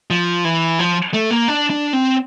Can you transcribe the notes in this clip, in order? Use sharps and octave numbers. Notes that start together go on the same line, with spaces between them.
F3
E3
F3
A3
A#3
D4
D4
C4